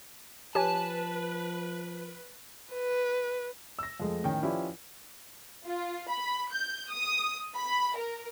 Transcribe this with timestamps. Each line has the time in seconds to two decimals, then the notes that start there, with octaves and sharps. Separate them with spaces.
0.55 F3 G4 B4 C#5 G#5 A5
2.73 B4
3.79 E6 A#6
4.00 F2 G#3 A3
4.23 A2 D#3 C#4 G5
4.42 F3 C#4 E4 G4 B4 D5
5.65 F4
6.09 B5
6.52 G6
6.91 D#6
7.56 B5
7.96 A#4